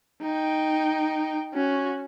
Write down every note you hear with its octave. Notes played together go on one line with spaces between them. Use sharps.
D#4 G5
C#4 F#4